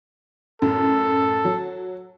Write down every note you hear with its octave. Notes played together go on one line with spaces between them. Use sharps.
F#2 A2 A4
F#3